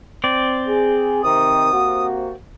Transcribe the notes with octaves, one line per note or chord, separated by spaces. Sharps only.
C4 D5
G#4
C3 D#3 D#6
C3 A#3 F#4